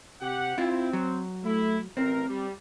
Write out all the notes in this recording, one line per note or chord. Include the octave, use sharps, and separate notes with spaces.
C3 G4 F#5
C4 E4 F4
F#3
A3 E4
A1 C4 A#4
G3